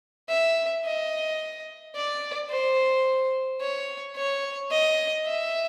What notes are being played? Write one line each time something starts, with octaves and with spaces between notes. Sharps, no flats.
E5
D#5
D5
C5
C#5
C#5
D#5
E5